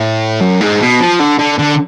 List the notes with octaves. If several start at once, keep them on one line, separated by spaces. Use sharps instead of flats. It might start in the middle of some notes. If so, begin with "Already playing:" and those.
Already playing: A2
F#2
G#2
B2
F3
D3
D3
D3